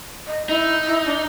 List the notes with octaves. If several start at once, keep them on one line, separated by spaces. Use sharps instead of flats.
D#5
D#4 E4
E4
D4